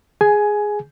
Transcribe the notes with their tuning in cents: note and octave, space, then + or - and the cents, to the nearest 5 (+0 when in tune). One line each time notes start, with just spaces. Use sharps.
G#4 +0 G#5 +10